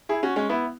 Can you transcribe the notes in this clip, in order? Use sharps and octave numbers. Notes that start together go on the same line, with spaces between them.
E4 G#4
C#4 F#4
G#3 C#4
B3 E4